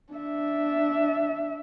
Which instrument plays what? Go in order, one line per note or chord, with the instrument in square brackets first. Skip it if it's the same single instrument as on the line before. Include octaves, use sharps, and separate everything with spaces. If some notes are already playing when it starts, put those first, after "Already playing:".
[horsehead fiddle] D4 E5